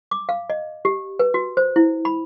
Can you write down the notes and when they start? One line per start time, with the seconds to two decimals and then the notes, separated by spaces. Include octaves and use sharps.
0.11 D6
0.29 F5
0.50 D#5
0.85 G4
1.19 B4
1.34 F#4
1.57 C5
1.76 E4
2.05 B5